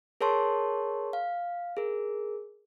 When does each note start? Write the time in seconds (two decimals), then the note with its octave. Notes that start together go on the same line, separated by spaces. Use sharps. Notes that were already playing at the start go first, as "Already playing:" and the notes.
0.21 G#4 A#4 C#5 A5 C6 C#6
1.13 F5
1.77 G#4 A#4